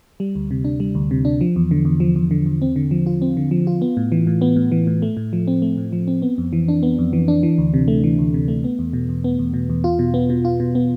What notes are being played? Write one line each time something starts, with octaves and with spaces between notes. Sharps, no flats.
G3
D2
C3
D4
G3
D2
C3
D4
F3
E2
D3
E2
F3
E2
D3
E2
C4
D3
F3
F4
C4
D3
F3
F4
B3
A2
E3
A2
B3
A2
E3
A2
A3
A2
F3
C4
A3
A2
F3
C4
B3
F2
E3
D4
B3
F2
E3
D4
E3
D2
C3
A3
E3
D2
C3
A3
B3
E2
B2
E2
B3
E2
B2
E2
F4
B2
B3
B2
F4
B2
B3